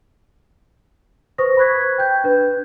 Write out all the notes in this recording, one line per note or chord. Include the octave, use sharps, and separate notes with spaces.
B4 C5 C#6 D#6 A#6
B5 C#6 F#6 G#6 B6
G#6
G5 G6
D4 B4